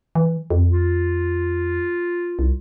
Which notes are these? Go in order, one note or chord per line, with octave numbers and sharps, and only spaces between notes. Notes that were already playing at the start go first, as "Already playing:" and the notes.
E3
F2
F4
C2